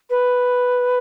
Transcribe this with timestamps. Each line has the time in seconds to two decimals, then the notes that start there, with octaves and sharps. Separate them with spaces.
0.10 B4